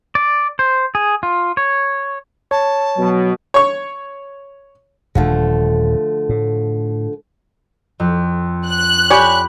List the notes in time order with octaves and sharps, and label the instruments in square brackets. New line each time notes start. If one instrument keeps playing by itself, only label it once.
[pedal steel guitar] D5
C5
G#4
F4
C#5
[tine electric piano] C#5 [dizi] A5
[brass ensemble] B2 [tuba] F#3
[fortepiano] C#5 C#6
[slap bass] D#1 [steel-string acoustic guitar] D3 F3 A3
[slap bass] A2
[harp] F2
[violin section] F#6
[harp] G4 B5 [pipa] C#5 D5 G#5